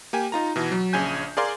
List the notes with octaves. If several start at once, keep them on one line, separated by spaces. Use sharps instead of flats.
A#3 G4 G#5
D#4 F4 A#5
B2 E3
F#3
A#1 C#3 G#5 G6
G#4 A#4 D5 F5 C6